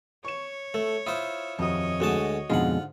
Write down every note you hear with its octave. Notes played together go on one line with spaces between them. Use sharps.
C#5 C#6 E7
A3 A4
E4 F4 C5 D#6
D#1 F2 F#4 C#5 D#5 D#6
D2 G#3 F#4 A5
F2 G#2 B2 D3 G#3 F4 F#5